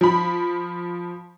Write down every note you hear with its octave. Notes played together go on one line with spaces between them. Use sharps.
F3 B5